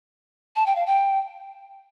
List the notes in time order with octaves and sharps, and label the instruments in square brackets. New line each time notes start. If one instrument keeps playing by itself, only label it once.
[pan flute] A5
G5
F5
G5